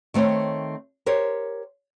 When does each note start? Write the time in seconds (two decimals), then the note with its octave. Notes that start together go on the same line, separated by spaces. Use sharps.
0.14 D#3 A3 C4 C#5
1.06 G4 A#4 C5 C#5